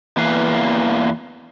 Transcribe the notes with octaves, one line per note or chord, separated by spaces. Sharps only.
E2 E3 A#3 B4 F5